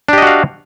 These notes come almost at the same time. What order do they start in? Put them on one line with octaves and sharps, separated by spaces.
D4 G4 D#5 F#4 F5